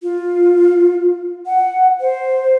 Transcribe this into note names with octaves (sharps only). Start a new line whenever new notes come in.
F4
F#5
C5